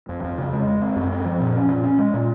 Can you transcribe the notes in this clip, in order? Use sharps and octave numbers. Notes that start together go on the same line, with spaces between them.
F2
F2
C#3
G#3
G#3
C4
F#2
C4
F3
A#2
C#4
A#2
C#4
G#3
A#2